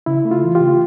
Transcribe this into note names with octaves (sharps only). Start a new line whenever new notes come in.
C#3 E4
A3
F4
E3
F4 G4
C#3